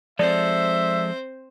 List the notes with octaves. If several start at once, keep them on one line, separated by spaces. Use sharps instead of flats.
F3 G#3 C4 A4 C5 D5 E5